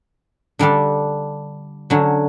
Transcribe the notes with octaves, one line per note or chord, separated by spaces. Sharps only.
D3 G3 D4 A4
D3 F#3 C#4